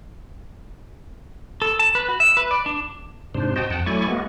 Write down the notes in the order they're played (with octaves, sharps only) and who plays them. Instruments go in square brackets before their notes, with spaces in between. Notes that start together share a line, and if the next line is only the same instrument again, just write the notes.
[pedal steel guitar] A4
A5
B4
F#4
E5
B4
D5
D4
[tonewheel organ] G#2 C3 D4 C5
F#4 C5 D#5 G5 A5
F2 F#5 G5 A5
F#3 A3 E4 D5 G#5 C#6
G#3 A#3 B3 F#4